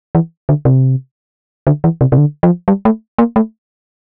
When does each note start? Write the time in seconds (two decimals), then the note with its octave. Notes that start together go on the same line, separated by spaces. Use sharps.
0.15 E3
0.49 D3
0.65 C3
1.67 D3
1.84 E3
2.01 C3
2.12 C3
2.18 D3
2.43 F3
2.68 G3
2.85 A3
3.18 A#3
3.36 A3